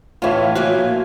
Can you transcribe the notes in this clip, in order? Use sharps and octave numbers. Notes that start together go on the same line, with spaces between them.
A2 E3 F4 C#5 E5
A#2 F3 A#3 F#4